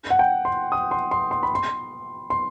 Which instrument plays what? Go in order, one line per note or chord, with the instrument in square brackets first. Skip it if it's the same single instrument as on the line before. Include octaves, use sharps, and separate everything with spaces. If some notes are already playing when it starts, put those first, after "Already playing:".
[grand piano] F#5
G5
C6
D#6
C6
C6
C6
B5
C6
C6